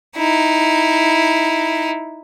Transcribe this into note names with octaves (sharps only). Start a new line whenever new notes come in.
D#4 E4